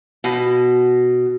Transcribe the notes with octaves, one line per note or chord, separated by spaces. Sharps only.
B2